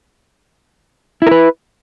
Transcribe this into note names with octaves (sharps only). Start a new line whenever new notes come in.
E4 A#4 B4